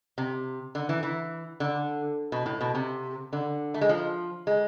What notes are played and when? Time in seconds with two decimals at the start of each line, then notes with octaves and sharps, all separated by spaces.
0.18 C3
0.75 D3
0.89 E3
1.03 E3
1.60 D3
2.32 B2
2.46 A2
2.61 B2
2.75 C3
3.33 D3
3.74 A3
3.81 G#3
3.89 F3
4.47 G#3